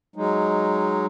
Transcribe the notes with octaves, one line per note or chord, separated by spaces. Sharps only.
F#3 G#3 D#4